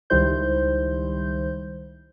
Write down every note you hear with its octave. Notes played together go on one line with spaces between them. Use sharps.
C#2 D#3 G3 E4 C5 G6